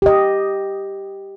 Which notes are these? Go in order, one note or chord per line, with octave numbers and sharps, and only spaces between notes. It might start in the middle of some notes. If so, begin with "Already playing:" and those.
G4 D#5